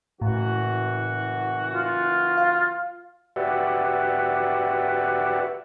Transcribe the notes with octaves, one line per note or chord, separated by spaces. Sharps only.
F#1 A2 E3 F#4
F4
F5
F#4 G4 B4 D5 E5 F#5